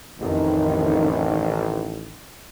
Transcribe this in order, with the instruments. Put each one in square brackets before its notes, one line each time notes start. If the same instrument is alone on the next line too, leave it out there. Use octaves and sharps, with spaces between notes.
[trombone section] A1 [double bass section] F2 D#3